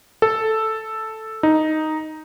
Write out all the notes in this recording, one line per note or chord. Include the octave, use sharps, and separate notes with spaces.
A4
D#4